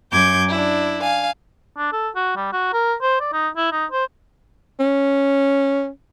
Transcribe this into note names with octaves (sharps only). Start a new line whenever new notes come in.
F#2 D6 G6 G#6
D4 E4
F5 G#5
D4
A4
F#4
G3
F#4
A#4
C5
D5
D#4
E4
D#4
C5
C#4